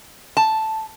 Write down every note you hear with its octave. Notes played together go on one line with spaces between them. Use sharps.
A5